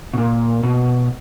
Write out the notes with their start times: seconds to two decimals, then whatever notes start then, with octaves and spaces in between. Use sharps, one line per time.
0.13 B2
0.18 A#2
0.63 B2